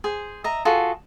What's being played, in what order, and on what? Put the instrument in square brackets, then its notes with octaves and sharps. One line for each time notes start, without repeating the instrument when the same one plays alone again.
[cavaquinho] G#4 C5
D#5 E5 A#5
F4 F#4 G#4 A4